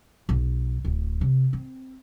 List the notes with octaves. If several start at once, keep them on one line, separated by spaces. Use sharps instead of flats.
B1
D1
C3
C4